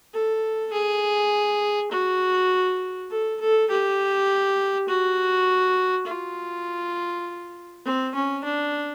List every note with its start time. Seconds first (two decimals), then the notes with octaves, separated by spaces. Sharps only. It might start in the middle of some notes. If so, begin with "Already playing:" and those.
0.14 A4
0.73 G#4
1.91 F#4
3.11 A4
3.41 A4
3.70 G4
4.88 F#4
6.07 F4
7.85 C4
8.15 C#4
8.44 D4